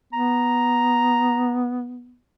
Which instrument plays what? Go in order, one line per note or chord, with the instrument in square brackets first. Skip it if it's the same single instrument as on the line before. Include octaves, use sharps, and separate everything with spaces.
[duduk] B3 [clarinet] A#5